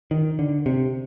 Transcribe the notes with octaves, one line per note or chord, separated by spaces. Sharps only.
D#3
D3
C3